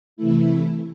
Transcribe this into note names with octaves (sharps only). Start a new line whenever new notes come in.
C3 E3 A3 E4